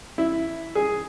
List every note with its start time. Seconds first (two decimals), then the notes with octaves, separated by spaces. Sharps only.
0.18 E4
0.75 G#4